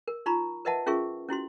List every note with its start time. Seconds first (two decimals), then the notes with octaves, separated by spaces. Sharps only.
0.08 A#4
0.26 D#4 F4 A#5 B5 C#6
0.65 A#4 B4 D#5 E5 F#5 A5
0.86 C#4 F4 G#4 A#4 E5 C#6
1.29 C#4 E4 F#4 C6